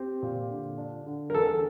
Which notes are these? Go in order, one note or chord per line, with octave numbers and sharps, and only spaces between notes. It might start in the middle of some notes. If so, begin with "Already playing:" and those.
Already playing: C4 G4
A#2
D3
D4
D3
A#4
E2 A4